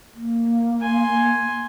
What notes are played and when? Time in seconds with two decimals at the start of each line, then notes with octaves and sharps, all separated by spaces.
0.14 A#3
0.81 G#5 C6